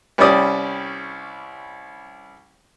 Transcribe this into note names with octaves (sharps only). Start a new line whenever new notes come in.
C2 G3 C#4 D5 D#6